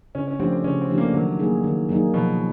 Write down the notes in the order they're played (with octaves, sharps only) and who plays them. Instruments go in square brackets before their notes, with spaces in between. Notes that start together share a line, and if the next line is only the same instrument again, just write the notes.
[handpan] C#3 [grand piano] C#4
[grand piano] C#4
[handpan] F3 A3 D4 G4 [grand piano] C4
[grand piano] C4
[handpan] C#3 [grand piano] C#4
[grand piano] C4
[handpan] F3 A3 D4 G4
[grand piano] A#3
[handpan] D#3 [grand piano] F#3
[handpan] F#3 A#3 D#4 G#4
D#3
F#3 A#3 D#4 G#4
[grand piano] B2 [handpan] F3